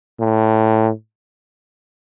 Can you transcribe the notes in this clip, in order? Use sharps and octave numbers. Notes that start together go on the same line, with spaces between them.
A2